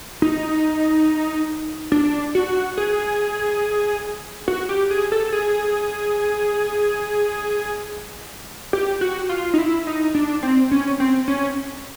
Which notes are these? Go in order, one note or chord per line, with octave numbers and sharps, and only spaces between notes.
D#4
D4
F#4
G#4
F#4
G4
G#4
A4
G#4
G4
F#4
F4
D#4
E4
D#4
D4
C4
C#4
C4
C#4